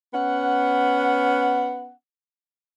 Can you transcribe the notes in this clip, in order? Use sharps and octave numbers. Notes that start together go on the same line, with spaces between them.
B3 C#4 F#5